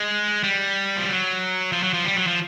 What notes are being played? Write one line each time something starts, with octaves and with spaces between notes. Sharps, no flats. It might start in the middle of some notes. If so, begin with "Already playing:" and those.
Already playing: G#3
G3
F3
F#3
F3
F#3
F3
G3
F#3
F3